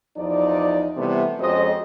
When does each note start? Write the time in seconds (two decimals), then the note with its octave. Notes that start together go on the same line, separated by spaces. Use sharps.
0.16 E2 F3 D#4 D5
0.97 C3 E3 G3 A3 B3
1.39 F2 G#3 C4 C#4 F#4 D#5